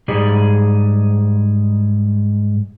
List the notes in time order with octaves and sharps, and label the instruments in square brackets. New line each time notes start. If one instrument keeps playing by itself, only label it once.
[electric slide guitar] G#2 G3 G4 G#4 D5